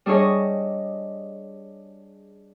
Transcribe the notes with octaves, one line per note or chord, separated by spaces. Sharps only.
G3 D4 G#4 C#5 D#5